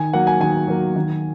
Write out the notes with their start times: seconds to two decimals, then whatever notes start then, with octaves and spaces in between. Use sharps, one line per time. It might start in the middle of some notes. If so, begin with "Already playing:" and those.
Already playing: D#3 G#5
0.13 F#3 A#3 F#5
0.27 G#5
0.40 D#3 G#5
0.68 F#3 A#3
0.96 D#3